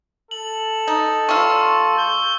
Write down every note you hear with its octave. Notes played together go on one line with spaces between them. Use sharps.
A4 F#7
D#4
G3 F4 C#6 E6
G6